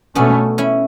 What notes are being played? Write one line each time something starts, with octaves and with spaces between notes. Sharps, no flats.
B2 A3 B3 C#4 D4
C#4 E4